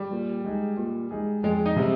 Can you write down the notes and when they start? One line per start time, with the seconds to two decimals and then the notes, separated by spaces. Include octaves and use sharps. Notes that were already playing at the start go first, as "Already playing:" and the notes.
Already playing: G3
0.11 A#2
0.44 G#3 D#4 G#4
0.77 A#2
1.11 G#3 D#4 G#4
1.43 F2 G#3
1.66 D#4
1.76 C3 G3 C4